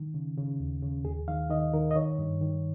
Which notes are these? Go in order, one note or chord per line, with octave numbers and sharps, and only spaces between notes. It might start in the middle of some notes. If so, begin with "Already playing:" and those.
Already playing: D#3
C#3
C#3
D#2
C#3
D#2 G#4
D#3 F5
D#3 D#5
D#3 A#4
D#5
D#3 C#5
G2
D#3